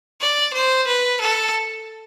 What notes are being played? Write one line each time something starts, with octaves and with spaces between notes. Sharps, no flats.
D5
C5
B4
A4